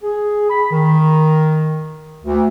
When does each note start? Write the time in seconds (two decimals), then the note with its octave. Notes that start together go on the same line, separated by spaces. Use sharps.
0.03 G#4
0.50 B5
0.71 D#3
2.23 D2